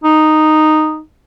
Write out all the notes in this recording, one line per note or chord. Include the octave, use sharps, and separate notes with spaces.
D#4